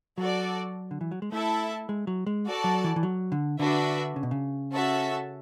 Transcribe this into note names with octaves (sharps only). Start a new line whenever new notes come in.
F#3 F#4 A4 D5
D3
E3
F#3
G#3
A3 E4 A4 E5 A5
G#3
F#3
G#3
F#4 A4 D5 A5
F#3
E3
E3
F#3
D3
D3 D4 F#4 B4 E5
C#3
B2
C#3
C#4 F#4 A4 E5 A5